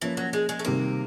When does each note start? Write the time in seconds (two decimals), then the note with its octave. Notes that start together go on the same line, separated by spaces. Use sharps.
0.02 E3 F3 A#3 C#4
0.17 F#3
0.33 G#3
0.49 G#3
0.59 A3
0.65 C3 D#3 G3 A#3 C4